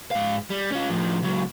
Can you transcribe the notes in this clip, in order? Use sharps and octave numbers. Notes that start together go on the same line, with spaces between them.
G#2 F5
G3
C#4 F4
A2 F3
C#2 F#3